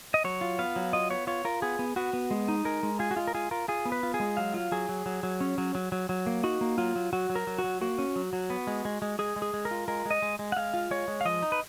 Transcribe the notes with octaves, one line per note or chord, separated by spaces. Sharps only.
D#5
F#3 C#5
F4
B3 F5
F#3
F4 D#5
B3 C#5
F4 C#5
F4 A#4
B3 G#4
B3
B3 F#4
B3
G#3
D#4
G#3 A#4
G#3
F4 G#4
F#4
G#3 F4
A#4
F4 G#4
F4 A#4
F4 G#4
B3
B4
F4
G#4
G#3
F#3 F5
F4
F#3 G#4
F#3
F#3
F#3
C#4
F#3
F#3
F#3
F#3
A#3
D#4 F#4
A#3
F#3 F4
F#3
F#3 F#4
F#3
A#4
F#3
F#4
F#3
A#3 F#4
C#4
F#3
F#3
B3
G#3
G#3
G#3
G#3 G#4
G#3
G#4
G#3
A#4
F4
G#3 A#4
G#3 D#5
G#3
G#3
F#5
G#3 F5
F4
G#3 C#5
G#3
F5
F3 D#5
D#4
B4